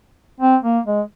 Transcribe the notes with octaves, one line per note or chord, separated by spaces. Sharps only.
C4
A#3
G#3